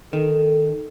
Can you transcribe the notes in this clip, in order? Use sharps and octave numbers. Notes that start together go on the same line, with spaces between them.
D#3 A4